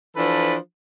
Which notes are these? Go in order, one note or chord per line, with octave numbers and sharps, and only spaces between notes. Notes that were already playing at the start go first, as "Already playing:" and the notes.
E3 F3 D4 A4 B4